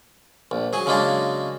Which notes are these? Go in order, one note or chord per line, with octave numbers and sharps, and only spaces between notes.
A#1
F#3 G#4
C#3 F#3 G#3 A#3 D4